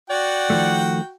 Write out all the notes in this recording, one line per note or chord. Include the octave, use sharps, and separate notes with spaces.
F#4 D5 F#5 G5
D#3 F3 A3